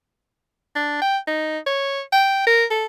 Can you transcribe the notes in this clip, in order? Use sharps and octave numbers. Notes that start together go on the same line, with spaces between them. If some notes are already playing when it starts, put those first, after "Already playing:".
D4
G5
D#4
C#5
G5
A#4
A4